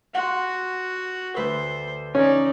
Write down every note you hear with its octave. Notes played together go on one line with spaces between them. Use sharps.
F#4 F#5 C6
D2 B4 C5 E6
C#4 D#4 D5